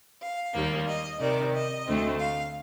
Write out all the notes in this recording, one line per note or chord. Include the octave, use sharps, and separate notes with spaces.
F5
D#2 D#3 G3 A#3
D#5
C3 D#3 G3 D5
D#5
D2 D3 A3 C4
F5